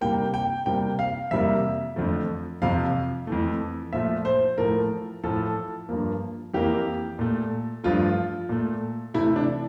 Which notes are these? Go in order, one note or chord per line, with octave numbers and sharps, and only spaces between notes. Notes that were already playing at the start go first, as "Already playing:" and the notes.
C3 G3 A#3 G5
G5
C3 G3 A#3 G5
F5
F2 C3 G3 A#3 E5
F2 D3 F3 A3
F2 C3 F3 F5
F2 E3 A3
A#2 F3 A3 E5
C5
A2 F3 A3 A#4
A2 F3 A3 A4
G2 F3 A#3
F2 E3 A#3 G4
A#2 A3
G2 F3 A3 F4
A#2 A3
C3 E3 A3 E4
D4